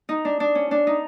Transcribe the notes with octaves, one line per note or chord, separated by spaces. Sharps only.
D#4
D4
D4
C#4
D4
D#4